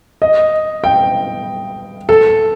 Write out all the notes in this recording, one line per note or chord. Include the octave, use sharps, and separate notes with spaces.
D#5
G5
A4